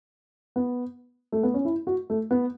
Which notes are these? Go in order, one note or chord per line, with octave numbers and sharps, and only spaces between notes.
B3
A3
B3
C#4
E4
F#4
A3
B3